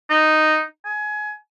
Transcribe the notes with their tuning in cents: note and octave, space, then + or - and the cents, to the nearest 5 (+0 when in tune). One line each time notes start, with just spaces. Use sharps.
D#4 -5
G#5 +25